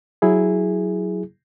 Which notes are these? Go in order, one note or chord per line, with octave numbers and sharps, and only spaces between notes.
F#3 E4 G#4